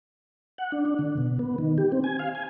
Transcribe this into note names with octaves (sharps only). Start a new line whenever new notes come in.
F#5
D4
D4
D3
B2
B3
D#3
G4
C4
G#5
F5
G#5